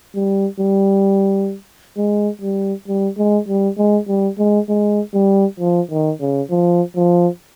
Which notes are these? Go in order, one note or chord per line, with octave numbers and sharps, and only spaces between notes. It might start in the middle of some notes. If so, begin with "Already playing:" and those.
G3
G3
G#3
G3
G3
G#3
G3
G#3
G3
G#3
G#3
G3
F3
D#3
C#3
F3
F3